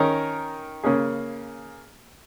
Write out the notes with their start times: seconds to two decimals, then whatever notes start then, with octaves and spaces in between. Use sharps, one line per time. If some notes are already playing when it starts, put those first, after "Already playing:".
Already playing: D#3 C#4 A#4
0.84 C#3 A#3 C#4 G#4